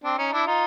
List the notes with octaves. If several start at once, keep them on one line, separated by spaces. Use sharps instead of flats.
C4 D4
C#4 D#4
D4 E4
D#4 F4